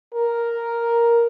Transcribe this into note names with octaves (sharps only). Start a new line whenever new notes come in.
A#4